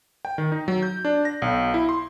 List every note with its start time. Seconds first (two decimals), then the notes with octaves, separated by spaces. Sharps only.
0.25 G5
0.38 D#3
0.52 D#4
0.68 F#3
0.83 G6
1.05 D4
1.25 A#6
1.42 B1
1.74 E4
1.89 C6